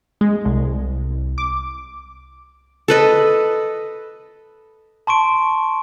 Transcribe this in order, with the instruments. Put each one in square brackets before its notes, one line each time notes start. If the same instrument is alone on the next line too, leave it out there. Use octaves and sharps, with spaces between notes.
[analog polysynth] G#3
C2
D6
[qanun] A4 B4 D#5
[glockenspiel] A5 C6 C#6 D7